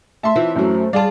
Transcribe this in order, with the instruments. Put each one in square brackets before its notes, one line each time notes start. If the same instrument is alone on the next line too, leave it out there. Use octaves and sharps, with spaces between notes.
[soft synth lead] A3 [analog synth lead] E5 [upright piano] A5 C6
[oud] E3 C4 E4 [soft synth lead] F4
[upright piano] F#2 F#3 [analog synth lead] A3 [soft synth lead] C5
[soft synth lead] G3 [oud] F4 G#4 F5 [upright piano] D5 A5